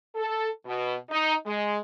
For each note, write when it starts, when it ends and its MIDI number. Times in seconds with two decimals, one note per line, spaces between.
0.16 0.47 69
0.66 0.94 47
1.10 1.34 63
1.46 1.78 56